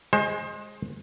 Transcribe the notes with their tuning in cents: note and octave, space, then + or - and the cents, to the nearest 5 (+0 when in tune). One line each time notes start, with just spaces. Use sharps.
G#3 +5 C5 +30